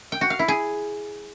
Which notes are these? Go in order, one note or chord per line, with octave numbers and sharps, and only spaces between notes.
G5
F#4
F5
E4
G#4